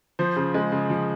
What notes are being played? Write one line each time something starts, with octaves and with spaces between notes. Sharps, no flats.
F3 C5
C#3
G#3
C#3
F3